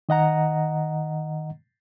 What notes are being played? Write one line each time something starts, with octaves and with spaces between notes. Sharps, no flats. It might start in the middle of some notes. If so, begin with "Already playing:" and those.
D#3 D#5 F#5 A#5